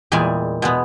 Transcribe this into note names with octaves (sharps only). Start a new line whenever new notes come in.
E2 A#2 G3 G#3 D5 G#5
B2 G#3 B3